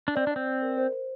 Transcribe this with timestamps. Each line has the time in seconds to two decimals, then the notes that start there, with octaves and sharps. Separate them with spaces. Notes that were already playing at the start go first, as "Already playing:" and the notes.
0.08 D4
0.16 C4 D5
0.27 D4
0.31 C4 D5
0.47 D5
0.62 A#4
0.78 C5
0.92 C5